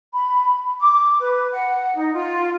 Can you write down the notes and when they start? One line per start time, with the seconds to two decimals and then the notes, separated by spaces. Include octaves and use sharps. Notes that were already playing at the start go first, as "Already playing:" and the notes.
0.13 B5
0.80 D6
1.20 B4
1.52 F#5
1.96 D#4
2.13 F4